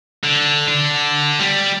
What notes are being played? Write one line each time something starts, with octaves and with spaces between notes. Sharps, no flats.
D3
D3
G3